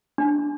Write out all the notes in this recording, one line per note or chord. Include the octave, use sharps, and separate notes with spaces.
D4